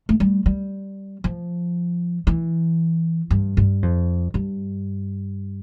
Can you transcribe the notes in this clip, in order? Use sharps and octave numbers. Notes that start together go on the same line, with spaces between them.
A3
G3
G3
F3
E3
G2
G2
F2
G2